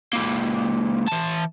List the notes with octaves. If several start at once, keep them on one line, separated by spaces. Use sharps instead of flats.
C#2 A#3
E3 A5